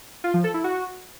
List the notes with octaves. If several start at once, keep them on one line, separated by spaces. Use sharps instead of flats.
F4
F3
A4
E4
F#4